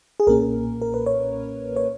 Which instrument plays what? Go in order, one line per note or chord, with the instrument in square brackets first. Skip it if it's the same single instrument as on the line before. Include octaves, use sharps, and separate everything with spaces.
[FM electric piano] G#4
B1 A#2 A#3 C#4 A#4
A#4
B4
C#5
C#5